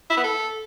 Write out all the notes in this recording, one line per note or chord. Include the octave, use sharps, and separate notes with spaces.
E4
B3
A4